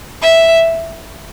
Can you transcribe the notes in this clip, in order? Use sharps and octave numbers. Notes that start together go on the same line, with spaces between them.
E5